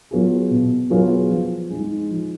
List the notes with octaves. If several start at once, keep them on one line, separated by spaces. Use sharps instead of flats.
F#3 B3 F4 G#4
B2
F#3 B3 F4 G#4
F3
G#3 D#4
F3